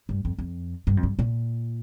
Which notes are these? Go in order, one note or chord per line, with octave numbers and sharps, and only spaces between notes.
G2
F2
F2
G2
F2
G2
A#2